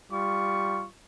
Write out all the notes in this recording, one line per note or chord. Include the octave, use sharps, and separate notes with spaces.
G3 F4 C#6